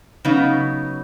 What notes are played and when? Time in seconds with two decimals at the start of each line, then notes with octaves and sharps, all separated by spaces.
0.25 C#3 F#3 B3 D#4